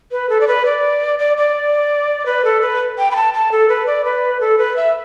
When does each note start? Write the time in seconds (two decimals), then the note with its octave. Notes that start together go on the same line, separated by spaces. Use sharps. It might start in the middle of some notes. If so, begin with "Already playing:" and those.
0.11 B4
0.30 A4
0.41 D5
0.47 B4
0.66 D5
1.19 D5
1.37 D5
2.26 B4
2.45 A4
2.61 B4
2.98 G5
3.11 B5
3.16 A5
3.34 A5
3.52 A4
3.69 B4
3.87 D5
4.05 B4
4.41 A4
4.58 B4
4.76 E5